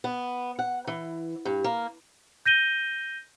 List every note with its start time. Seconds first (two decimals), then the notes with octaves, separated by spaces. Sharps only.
0.04 B3
0.59 F#5
0.87 E3
1.45 G2
1.64 A#3
2.46 G6 A#6 D#7 G7